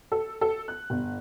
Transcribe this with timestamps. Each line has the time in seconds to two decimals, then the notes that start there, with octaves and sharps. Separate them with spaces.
0.12 A4
0.41 A4
0.68 F#6
0.90 G1